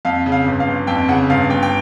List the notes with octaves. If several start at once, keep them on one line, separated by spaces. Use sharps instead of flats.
F2 F5
C#3
F5
G1
F5
G1
F2 G5
C#3 F#5
G1 F5
G1 G5
G5